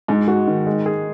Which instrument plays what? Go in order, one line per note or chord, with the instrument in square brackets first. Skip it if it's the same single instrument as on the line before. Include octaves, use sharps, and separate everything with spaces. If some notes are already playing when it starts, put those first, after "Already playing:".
[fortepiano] G#2 [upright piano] G#3
[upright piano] F#4
D#3
G#3
G#4